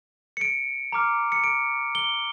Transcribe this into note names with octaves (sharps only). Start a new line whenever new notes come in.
C#7
D7
A#5 D6 F6
C#7
D7
G7